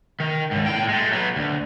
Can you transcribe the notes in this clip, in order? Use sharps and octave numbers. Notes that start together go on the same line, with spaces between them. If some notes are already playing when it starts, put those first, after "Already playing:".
D#3
C#2 G#2
A2 G5
G#3 A3
F#3 B3
D2